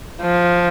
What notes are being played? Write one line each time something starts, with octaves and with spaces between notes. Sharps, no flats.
F3